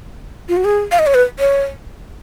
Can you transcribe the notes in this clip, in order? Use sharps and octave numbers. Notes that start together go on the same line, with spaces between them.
F4
F#4
G#4
F5
D#5
C#5
B4
C#5